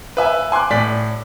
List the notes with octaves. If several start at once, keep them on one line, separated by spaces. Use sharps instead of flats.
B4 E5 G#5
G#5 C6 D6 F#6
A2 D5 B6